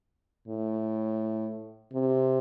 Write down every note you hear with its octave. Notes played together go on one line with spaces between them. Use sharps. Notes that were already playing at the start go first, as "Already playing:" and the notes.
A2
C3